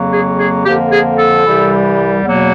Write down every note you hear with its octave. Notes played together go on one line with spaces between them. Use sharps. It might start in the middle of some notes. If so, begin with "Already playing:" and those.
Already playing: F2 C#3 F#3 A#3
G#4
G#4
F2 D3 F3 A#3 G4
G#4
A4
C2 C3 E3 G3
E2 B2 F#3 A#3